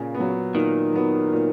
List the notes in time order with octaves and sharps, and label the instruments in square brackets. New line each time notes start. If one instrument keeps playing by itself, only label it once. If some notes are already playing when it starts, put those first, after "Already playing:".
Already playing: [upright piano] A#2 [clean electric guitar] C#3
[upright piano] B3
F#3
[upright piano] A#2 [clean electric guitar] D#3
[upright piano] F#3 B3
A#2